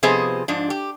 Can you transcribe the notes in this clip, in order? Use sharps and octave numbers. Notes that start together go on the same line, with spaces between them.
C3 F3 B3 G#4 C5 D#5
G#2 F3 D4
G4